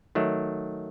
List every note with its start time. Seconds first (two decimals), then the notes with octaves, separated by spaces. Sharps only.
0.15 D#3 F#3 A3